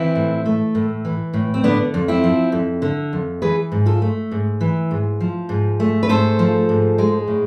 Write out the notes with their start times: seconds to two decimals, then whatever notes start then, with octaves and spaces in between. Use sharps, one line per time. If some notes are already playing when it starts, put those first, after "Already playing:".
Already playing: E3 C4 E4
0.16 A2
0.46 A3
0.75 A2
1.05 E3
1.34 A2
1.54 C4
1.64 D3 B3 D4
1.94 F2
2.08 C4 E4
2.24 F3
2.52 F2
2.82 D3
3.13 F2
3.42 E3 G#4 B4
3.72 G#2
3.86 F4 A4
4.02 A3
4.31 G#2
4.61 E3
4.91 G#2
5.21 F3
5.49 G#2
5.80 A3
6.03 B4
6.09 G#2 A4 C5
6.39 F3
6.69 G#2
6.98 G#3
7.28 A2